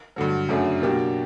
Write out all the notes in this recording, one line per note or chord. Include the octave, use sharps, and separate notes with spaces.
G2 D3 F#3
F#2 C#3 F#3 A3 D4
B2 F#3 A#3 D4 G4